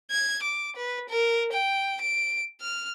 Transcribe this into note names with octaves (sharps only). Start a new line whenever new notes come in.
G#6
D6
B4
A#4
G5
D7
F6